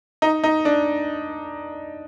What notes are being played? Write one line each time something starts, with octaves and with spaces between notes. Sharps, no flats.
D#4
D#4
D4